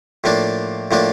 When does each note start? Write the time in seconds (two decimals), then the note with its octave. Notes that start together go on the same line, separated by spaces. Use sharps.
0.24 A2 F3 A#3 D4
0.91 A2 F3 A#3 D4